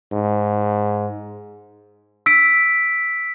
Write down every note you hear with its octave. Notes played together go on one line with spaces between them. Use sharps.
G#2
E6 B6 D7